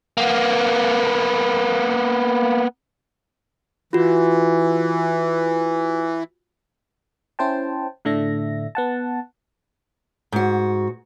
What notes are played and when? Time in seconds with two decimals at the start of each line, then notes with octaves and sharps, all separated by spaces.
0.17 A#3 B3
3.93 E3 F4 F#4
7.39 C#4 E4 C5 G5 A5
8.05 A2 D3 A3 D4 E5 A#6
8.75 B3 F#5 A5
10.32 G#2 F#4